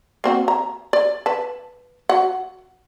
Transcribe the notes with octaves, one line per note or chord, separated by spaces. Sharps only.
A#3 C4 F#4
A#5
D5
B4 A5
F#4 F#5